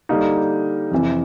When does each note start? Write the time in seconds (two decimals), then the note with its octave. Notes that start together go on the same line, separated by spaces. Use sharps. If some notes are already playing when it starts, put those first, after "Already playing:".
0.09 D3 G3 A#3 D#4
0.92 F2 C3 E3